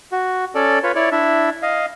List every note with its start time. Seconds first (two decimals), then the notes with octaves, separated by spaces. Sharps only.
0.12 F#4
0.55 C#4 A4 D5
0.83 F4 B4 C#5
0.95 E4 C#5 D5
1.12 D4 E4 E5
1.62 D#5 F5